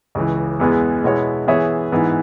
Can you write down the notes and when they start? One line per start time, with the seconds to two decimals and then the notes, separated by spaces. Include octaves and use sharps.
0.15 C#2 C#3 E3
0.60 E2 E3 G#3 B3 G#4
1.04 B2 G#3 B3 E4 C#5
1.47 E3 B3 G#4 C#5 E5
1.92 G#2 E3 B3